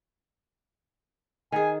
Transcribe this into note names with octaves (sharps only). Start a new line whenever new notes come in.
D#3 G#4 G#5